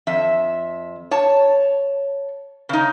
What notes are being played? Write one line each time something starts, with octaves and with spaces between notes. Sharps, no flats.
F2 E5
C#5 A5
C#3 D#4